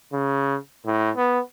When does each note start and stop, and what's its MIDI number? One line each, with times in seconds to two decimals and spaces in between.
0.13 0.57 49
0.86 1.10 45
1.16 1.40 59